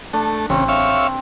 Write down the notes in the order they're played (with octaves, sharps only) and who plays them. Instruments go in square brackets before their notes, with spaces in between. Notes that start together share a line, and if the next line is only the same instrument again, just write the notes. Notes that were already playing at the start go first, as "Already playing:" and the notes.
[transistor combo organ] A3 [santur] D4
[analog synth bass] A1 [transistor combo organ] C#3 [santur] C4
[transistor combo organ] C#5 E5 F5